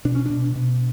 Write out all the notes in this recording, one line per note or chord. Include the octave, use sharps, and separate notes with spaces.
B2 D4
C#4
B2 D4
B2